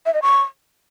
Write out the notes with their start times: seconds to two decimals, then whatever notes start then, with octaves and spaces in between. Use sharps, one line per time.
0.06 E5
0.14 D#5
0.22 C#6